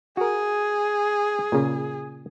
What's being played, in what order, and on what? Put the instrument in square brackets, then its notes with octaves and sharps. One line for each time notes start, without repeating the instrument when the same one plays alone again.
[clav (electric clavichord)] F#4 A#4 [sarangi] G#4
[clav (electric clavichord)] A#2 C#3